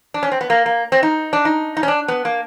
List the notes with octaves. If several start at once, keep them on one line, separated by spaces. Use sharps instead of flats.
D4
C#4
C4
B3
A#3
A#3
C4
D#4
D4
D#4
D#4
C#4
D4
B3
A#3